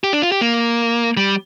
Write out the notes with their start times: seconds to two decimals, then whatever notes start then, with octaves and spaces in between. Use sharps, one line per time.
0.04 G4
0.13 D4
0.22 F4
0.32 G4
0.41 A#3
1.17 G3